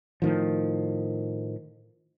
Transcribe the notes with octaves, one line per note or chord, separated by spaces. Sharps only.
A2 D#3 F3